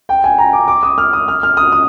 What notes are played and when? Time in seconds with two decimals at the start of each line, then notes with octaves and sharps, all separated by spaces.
0.09 G5
0.24 G#5
0.38 A#5
0.53 D6
0.68 D6
0.83 D#6
0.98 F6
1.13 D#6
1.28 F6
1.43 F6
1.57 D#6
1.72 D#6